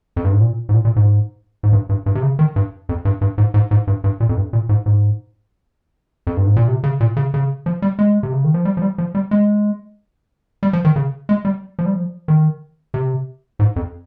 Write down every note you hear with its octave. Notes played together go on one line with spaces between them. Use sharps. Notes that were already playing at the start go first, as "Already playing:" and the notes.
F2
G2
G#2
A#2
G#2
A#2
A#2
G#2
G#2
G2
G2
G2
C3
C#3
D#3
G2
F2
G2
G2
G#2
G#2
G#2
G2
G2
A#2
F2
G2
A#2
G#2
G#2
F2
G2
G#2
A#2
C3
C#3
A#2
C#3
C#3
F3
G3
G#3
C3
C#3
D#3
F3
G3
F3
G3
F3
G3
G#3
G3
F3
D#3
C#3
G#3
G3
F3
G3
F3
D#3
C3
G#2
F2